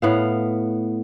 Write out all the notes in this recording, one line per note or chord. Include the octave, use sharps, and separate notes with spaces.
A2 B3 F5